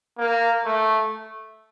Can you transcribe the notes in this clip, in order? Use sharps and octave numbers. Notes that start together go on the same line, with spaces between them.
A#3
A3